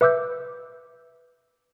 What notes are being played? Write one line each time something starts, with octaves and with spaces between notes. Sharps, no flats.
B4 E5 D6 E6 G6